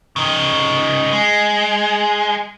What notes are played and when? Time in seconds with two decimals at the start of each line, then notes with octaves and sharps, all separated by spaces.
0.16 C#3 D#4
1.13 G#3